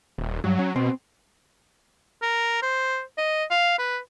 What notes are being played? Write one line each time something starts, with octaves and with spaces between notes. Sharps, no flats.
D#1
G2 F#3
C#4
B2 C4
A#4
C5
D#5
F5
B4